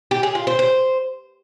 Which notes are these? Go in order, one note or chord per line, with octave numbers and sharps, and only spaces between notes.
G4
G#4
F4
C5
C5